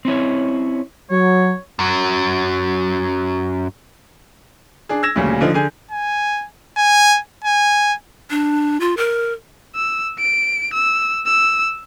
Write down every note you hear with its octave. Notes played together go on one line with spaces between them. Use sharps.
C4 C#4 E4 C#5
F#3 C#5
F#2 F#3
D4 G#4
E6 G#6 A#6 E7
D2 A#2 C#3 G3
D3 F3 D#4
D3 G#4 G#5 G6
G#5
G#5
G#5
D4
F4
A#4
E6
D7
E6
E6